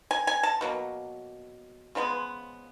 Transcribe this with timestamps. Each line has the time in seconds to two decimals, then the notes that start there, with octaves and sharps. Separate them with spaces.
0.11 G#5
0.27 G#5
0.43 A5
0.61 B2 F#3 A#3
1.95 C#3 F3 G#3 B3